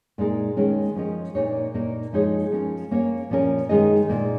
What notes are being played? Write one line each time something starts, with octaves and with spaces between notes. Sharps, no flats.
A#2 G#3 D#4 A#4
D#3 G#3 C#4 A#4
F3 C#4 A#4 D#5
A#2 A#3 D#4 A#4 C#5
A#2 A#3 D#4 A#4
F3 G#3 D#4 G#4 C#5
F3 C#4 A#4
A#3 C#4 A#4 C#5
A#2 F3 C#4 A#4
D#3 G#3 D#4 G#4 D#5
A#2 A#3 D#4